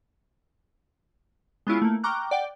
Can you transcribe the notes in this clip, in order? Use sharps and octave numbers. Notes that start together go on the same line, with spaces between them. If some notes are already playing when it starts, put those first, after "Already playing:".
G#3 B3 C#4 E4 F4
A3 A#3
G5 A#5 C#6 D6 F6 F#6
D5 F#5 G5